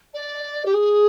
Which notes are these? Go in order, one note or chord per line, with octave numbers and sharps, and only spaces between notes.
D5
G4
G#4